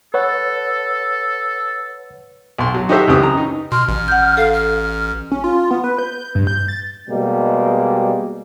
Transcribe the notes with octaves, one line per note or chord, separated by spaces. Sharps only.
A4 B4 C#5 F#5
B1 C6
F#3
D#4 F#4 G4 A4 C5 E5
C#2 F#2 C3 E3 G4 D#6
A#5
D#4
B2 C6 F6
A1
F#5 G6
A4 F5
F6
C#4
F4
B3
B4
G6
G6
G2
G6
A6
B2 G3 G#3 A#3